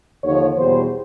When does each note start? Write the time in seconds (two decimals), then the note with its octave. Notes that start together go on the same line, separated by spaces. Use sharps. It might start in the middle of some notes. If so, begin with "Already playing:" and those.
0.23 D#2 D3 F3 C#5
0.57 E2 B2 G3 C5